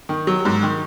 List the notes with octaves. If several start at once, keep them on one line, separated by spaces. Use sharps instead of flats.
D#3
F#3
G#2
D#3